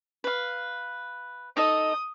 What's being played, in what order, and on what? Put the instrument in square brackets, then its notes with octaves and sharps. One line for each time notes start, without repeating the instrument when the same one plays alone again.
[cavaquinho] B4 F5
[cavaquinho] D#4 A4 D#5 [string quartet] D#6